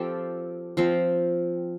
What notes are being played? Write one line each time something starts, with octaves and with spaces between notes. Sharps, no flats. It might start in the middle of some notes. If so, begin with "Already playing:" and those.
Already playing: F3 C4 G4 A4
F3 C4